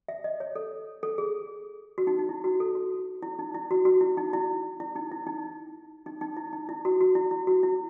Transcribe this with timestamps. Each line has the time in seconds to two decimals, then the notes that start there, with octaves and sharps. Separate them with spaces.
0.08 E5
0.24 D#5
0.40 C#5
0.55 A4
1.03 A4
1.18 G#4
1.98 F#4
2.07 D#4
2.18 D#4
2.29 E4
2.44 F#4
2.60 A4
2.75 F#4
3.23 E4
3.39 D#4
3.54 E4
3.71 F#4
3.85 F#4
4.01 E4
4.17 D#4
4.33 E4
4.80 E4
4.95 D#4
5.12 E4
5.27 D#4
6.06 D#4
6.21 D#4
6.37 E4
6.53 D#4
6.69 E4
6.85 F#4
7.01 F#4
7.15 E4
7.31 E4
7.47 F#4
7.63 E4